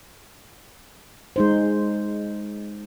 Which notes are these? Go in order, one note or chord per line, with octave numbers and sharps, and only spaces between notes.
G#3 D#4 C5